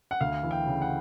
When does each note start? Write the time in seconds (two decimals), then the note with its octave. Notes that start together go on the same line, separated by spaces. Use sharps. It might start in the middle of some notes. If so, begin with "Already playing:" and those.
0.11 F#5
0.21 D2 F5
0.43 E3
0.51 G5
0.66 C#3
0.82 F#5